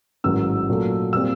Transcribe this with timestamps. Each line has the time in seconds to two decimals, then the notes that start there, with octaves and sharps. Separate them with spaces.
0.24 A1 G#2 D#3 F#3 E6
0.69 A#2 F#3 A3
1.13 A#2 G3 C4 E6